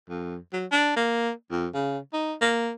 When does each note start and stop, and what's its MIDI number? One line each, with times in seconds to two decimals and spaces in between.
0.09 0.37 41
0.53 0.66 54
0.72 0.95 62
0.96 1.31 58
1.51 1.67 41
1.74 1.98 49
2.13 2.35 63
2.42 2.72 58